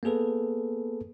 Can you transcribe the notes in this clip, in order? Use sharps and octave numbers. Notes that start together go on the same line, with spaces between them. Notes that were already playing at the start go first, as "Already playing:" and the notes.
A#3 B3 G#4 A4 B4